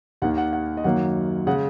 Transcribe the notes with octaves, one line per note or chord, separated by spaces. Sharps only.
D#2 D#3 A#3 F#5
F#5
F#5
D#5
F#2 D#3 F#3 A#3 F#5
C#3 G#3 F#5